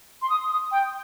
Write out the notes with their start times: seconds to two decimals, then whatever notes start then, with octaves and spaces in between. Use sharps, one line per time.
0.22 C6
0.30 D#6
0.51 D#6
0.72 G5